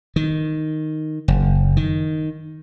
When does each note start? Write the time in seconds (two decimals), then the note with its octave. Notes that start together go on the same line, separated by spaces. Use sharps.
0.16 D#3
1.28 F#1
1.77 D#3